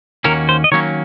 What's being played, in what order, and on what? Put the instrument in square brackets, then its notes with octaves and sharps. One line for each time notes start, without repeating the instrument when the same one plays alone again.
[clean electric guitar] D#2 D#3 A#3 C#4 F#4 [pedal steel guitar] A#4
[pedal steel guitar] C5
D#5
[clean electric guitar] D#3 F#3 A#3 C#4 [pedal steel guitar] C#5